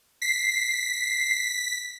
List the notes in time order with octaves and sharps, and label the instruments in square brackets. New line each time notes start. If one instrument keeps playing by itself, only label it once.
[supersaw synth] B6 [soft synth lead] C7